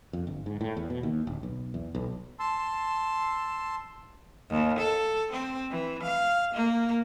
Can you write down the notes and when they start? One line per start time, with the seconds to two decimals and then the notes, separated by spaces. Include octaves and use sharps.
0.13 F2
0.27 G1
0.46 G#2
0.61 A2
0.77 E2
0.90 B2
1.03 D#2
1.27 D1
1.43 B1
1.74 E2
1.95 B1
2.39 A5 C6 E6
4.50 D#2
4.79 A4
5.32 C4
5.71 E3
6.03 F5
6.54 A#3